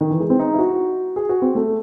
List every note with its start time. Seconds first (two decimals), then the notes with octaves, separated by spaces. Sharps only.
0.01 D#3
0.11 E3
0.20 G#3
0.30 C4
0.39 D#4
0.54 E4
0.59 F#4
1.16 G#4
1.29 F#4
1.42 C4
1.55 A3